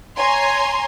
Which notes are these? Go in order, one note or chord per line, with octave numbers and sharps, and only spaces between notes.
C#5 G#5 A#5 C6